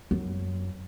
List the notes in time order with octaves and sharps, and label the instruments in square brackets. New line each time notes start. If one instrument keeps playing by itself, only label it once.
[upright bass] F#2